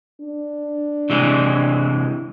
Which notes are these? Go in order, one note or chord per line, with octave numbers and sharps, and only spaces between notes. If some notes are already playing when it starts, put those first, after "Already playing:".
D4
C3 E3 G#3